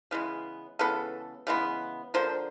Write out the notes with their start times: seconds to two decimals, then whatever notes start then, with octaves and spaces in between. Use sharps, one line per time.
0.11 C#3 E3 G#3 B3
0.79 C#3 E3 G#3 B3 A4
1.47 C#3 E3 G#3 B3
2.14 D3 F3 A#3 C5